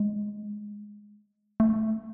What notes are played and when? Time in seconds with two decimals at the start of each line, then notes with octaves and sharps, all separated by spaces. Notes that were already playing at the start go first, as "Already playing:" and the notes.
Already playing: G#3
1.60 A3